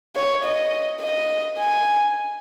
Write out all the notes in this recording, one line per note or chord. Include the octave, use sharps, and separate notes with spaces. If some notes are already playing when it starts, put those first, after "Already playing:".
C#5
D#5
D#5
G#5